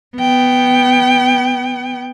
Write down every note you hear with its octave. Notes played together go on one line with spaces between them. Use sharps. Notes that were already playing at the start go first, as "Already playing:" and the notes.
B3 G5